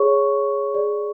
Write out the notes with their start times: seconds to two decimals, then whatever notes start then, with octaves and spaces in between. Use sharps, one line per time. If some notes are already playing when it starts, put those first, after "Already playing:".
Already playing: G#4 C#5 C#6
0.74 G#4 D5